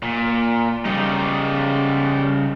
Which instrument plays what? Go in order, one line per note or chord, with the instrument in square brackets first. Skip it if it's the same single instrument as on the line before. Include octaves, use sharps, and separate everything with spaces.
[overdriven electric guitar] A#2
[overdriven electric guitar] C#3 D#4 [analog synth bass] G3